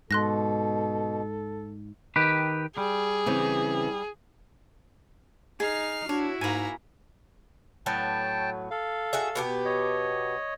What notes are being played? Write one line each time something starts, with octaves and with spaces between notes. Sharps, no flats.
G#2 B2 A4 C6 F#6 A#6
D#3 G4 B4
G3 G#4
C#3 E3 C4
D#4 G#4 F6 C7
D4 E4 F#4 C#5
G#2 A#3 G#5 A#5 B5
A2 F#3 B3 G5 A5
A4 F5
F#4 G#4 E5
B2 B3 G4
C#5 D#5